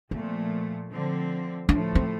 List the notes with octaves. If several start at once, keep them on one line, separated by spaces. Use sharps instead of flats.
A#2 F3 A3 C4
D3 F3 C4
A2 F3 A3 D4
C4